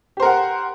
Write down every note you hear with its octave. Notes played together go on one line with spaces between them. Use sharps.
G4 A#4 C5 F#5